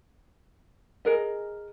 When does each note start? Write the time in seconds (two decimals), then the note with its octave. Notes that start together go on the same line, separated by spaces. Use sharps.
1.05 G#4 A#4 D#5